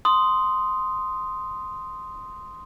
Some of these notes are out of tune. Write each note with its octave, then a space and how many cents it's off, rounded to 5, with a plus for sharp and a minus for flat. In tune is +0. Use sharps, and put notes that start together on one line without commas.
C6 -5 D#6 +0